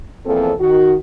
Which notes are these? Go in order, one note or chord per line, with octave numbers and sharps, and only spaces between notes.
E2 A#2 F3 C4 A4
D#3 F#4